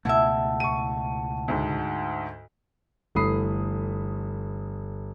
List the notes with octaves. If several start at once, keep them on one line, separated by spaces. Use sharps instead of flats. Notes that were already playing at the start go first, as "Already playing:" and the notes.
C#2 B2 A3 E4 E5 F#5 A5
C#6 D#7
D2 G#2
G1 E3 A3 B5 D#6 C7